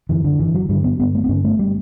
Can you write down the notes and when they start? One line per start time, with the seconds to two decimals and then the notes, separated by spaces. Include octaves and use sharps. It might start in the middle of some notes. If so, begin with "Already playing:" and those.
0.09 F#2 D3 E3
0.24 D3
0.39 G1 E3
0.55 F#3
0.69 G2 D3 G3
0.84 B3
0.99 G1 B3
1.14 A3
1.24 B3
1.29 G2 D3 C#4
1.45 A3
1.59 G3